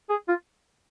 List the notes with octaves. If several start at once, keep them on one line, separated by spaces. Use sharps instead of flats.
G#4
F4